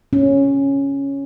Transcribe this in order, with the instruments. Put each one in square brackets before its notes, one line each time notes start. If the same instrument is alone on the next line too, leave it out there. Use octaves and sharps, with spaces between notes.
[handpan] C#4